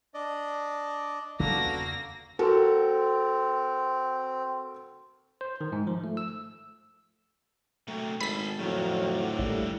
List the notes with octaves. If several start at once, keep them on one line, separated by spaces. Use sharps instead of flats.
D4 D5 D#5
E2 C#3 A#3 B3 D4 F#4 A4 A#6
C4 F#4 A4 A#4
C5
D#3
G#2
F3
A3
E6
C3 F#3 A3
G#1 G#4 A4 B5 B6
F2 A2 D3 D#3 F3 F#3
A1 G3 A3 A#3